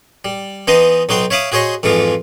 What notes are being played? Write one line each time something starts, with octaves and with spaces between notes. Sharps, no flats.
G3
E3 B3 D#4 C5 D#5
B1 D#4 F#4 C5 G5
C#5 E5 F5 B5 D6 D#6
F#4 G#4 C5 C#5 D#5
F2 G#2 E3 F3 F4